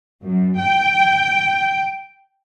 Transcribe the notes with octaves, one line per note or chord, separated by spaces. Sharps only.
F#2
G5